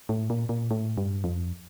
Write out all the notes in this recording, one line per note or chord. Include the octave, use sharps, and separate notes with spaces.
A2
A#2
A#2
A2
G2
F2